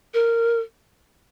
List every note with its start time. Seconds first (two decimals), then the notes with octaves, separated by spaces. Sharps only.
0.14 A#4